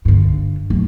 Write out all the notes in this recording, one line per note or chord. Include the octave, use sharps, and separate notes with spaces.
G2 D3
D1 F3